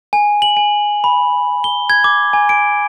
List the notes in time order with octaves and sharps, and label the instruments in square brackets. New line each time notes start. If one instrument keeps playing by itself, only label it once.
[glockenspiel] G#5
F#7
G#5
B5
G7
G#6
D6
G#5
D7